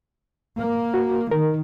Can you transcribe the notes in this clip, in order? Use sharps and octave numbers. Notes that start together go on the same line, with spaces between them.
A#3
F#4
D#3 A#4